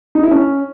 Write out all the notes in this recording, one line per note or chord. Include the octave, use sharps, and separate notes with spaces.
D#4
E4
C#4